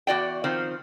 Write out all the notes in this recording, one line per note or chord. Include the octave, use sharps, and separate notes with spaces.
E2 F#4 D5 G5
D#3 F3 C4